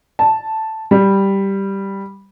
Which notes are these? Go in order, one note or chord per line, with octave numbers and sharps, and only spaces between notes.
A5
G3